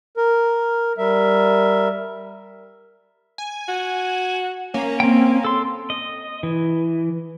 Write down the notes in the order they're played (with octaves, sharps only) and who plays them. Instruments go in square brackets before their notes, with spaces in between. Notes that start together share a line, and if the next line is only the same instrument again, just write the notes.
[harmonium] A#4
G3 A#4 E5
[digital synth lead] G#5
[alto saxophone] F#4
[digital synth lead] A#3 [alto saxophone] C#4
[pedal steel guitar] C4 G5
A4 C6
D#5
E3